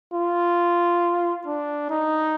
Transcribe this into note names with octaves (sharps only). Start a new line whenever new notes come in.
F4
D4
D#4